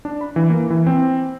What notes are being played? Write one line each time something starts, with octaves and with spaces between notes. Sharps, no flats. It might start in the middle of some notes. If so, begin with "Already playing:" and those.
D4
B5
E3
A#3
E3
C4